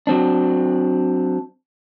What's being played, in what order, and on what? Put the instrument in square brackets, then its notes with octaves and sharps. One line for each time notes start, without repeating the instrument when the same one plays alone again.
[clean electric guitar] F#3 C4 D4